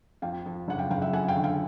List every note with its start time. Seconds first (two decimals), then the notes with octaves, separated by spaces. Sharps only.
0.22 F2 F5 G5
0.46 F2
0.68 F#1 F#5
0.79 F5 G5
0.90 F#1 F5 G5
1.02 E5 F#5
1.13 F2 F#5 G#5
1.28 F5 G5
1.36 D3
1.44 F5 G5